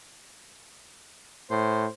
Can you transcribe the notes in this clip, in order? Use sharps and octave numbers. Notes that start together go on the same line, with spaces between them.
A2 C5